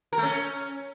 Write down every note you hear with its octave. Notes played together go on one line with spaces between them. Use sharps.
A#4
A3
C#4